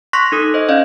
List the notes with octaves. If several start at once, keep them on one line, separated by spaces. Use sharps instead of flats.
C6 C#6 F#6 A#6 B6
D#4 A4 D#6
C5 D#5
C#4 D5 D#5 F5